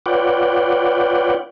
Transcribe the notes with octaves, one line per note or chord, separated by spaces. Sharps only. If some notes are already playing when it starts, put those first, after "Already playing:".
F4 B4 C#5 D5 F#5 G5